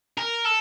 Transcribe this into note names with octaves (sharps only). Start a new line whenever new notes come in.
A#4
A4